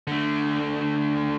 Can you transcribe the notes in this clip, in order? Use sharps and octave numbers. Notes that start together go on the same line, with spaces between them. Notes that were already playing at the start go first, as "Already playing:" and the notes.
D3 A3